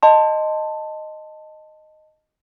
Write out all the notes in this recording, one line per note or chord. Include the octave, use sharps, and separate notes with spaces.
D#5 A5 C6